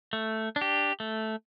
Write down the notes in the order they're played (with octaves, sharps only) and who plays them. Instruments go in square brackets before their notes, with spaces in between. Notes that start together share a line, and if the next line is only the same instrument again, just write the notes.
[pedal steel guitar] A3
D4
G4
A3